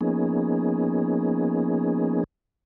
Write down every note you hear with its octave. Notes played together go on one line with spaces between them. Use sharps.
F3 A#3 B3 C#4 D#4 G#4